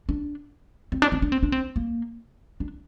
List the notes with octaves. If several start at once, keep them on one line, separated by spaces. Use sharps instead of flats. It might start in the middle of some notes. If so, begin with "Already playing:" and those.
D4
C4
D4
C4
D4
C4
D4
C4
A#3
D4